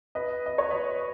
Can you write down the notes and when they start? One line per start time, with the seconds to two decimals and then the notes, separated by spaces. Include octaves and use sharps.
0.15 B4 D#5
0.46 D#5
0.58 C#5
0.70 B4 D#5